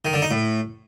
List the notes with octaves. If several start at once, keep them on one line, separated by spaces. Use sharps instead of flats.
D#3
D3
D#4
A2